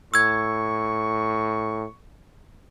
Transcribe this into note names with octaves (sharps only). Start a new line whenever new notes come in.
A2 C#6 E6 G#6